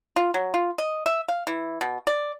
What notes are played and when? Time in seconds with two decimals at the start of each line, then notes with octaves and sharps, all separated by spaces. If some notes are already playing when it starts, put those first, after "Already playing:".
0.16 F4
0.34 F#3
0.54 F4
0.78 D#5
1.06 E5
1.28 F5
1.47 E3
1.81 B2
2.07 D5